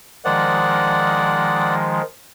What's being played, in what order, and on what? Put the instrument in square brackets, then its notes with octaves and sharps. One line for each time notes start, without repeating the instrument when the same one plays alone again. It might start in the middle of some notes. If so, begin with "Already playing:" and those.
[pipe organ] D#3 F3 G#3 [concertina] D5 F#5